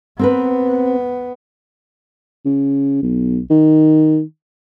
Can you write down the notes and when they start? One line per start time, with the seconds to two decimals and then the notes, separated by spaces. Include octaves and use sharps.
0.19 B3 C4 A#4 B4
2.45 C#3
3.03 B1
3.50 D#3